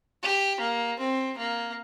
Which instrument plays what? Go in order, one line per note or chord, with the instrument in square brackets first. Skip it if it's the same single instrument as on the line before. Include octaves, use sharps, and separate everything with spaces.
[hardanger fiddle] G4
A#3
C4
A#3